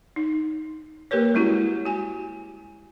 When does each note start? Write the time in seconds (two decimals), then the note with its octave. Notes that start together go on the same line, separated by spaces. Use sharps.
0.16 D#4
1.11 A#3 G4 A#4 B4 C#5
1.34 G3 G#3 C#4 E4 F#4 G4
1.85 F#4 G#5